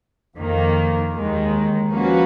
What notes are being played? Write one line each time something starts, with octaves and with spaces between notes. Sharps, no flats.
F2 D#3 A#3
D#2 D#3 G#3
F3 A#3 C#4 F#4 B4